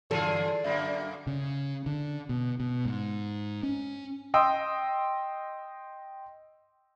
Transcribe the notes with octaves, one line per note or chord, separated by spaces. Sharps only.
G2 D3 E3 F3 F4 G#4 A4 D5
F#2 D3 A#3 E5 B5
C#3
D3
B2
B2
G#2
C#4
D#5 G5 C6 D#6 E6